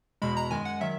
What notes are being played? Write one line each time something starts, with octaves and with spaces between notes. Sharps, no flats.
E2 B2 G#3 B5
A#5
F#2 D#3 G#3 G#5
F#5
D#3 F#3 E5